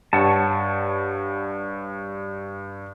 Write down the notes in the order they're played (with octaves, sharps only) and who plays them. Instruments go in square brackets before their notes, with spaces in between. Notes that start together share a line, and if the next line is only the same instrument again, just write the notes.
[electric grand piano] G2 [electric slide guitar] C#5 F#5 A5